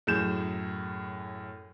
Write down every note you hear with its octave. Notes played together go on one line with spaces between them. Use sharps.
F#2 A2 G#4 G6 E7